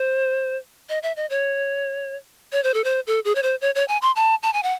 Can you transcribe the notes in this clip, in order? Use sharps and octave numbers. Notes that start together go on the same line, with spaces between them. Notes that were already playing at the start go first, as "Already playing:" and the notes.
Already playing: C5
D#5
E5
D#5
C#5
C#5
C5
A4
C5
A4
G#4
C#5
C5
C#5
C#5
G#5
C6
A5
A5
G#5
F#5